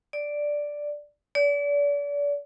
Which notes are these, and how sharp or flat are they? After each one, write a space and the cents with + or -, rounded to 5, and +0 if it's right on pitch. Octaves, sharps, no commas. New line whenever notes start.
D5 +0
D5 -35